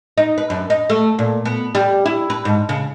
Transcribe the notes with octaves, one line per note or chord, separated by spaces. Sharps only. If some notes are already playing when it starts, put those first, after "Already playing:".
D#4
B4
F#2
D#4
A3
A#2
B3
G3
E4
B4
G#2
C#3